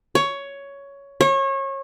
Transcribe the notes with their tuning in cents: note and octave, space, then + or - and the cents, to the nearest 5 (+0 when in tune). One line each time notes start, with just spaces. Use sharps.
C#5 +10
C#5 -30